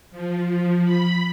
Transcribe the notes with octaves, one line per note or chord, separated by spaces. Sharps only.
F3
B5